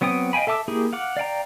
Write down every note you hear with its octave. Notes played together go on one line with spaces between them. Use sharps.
F#3 B3 C4 G5 D#6
D#5 F5 G5 G#5 B5
A4 E5 A5 D6 E6
A#3 E4 G4 G#4
F5 F#5 D6
D5 F5 G5 A#5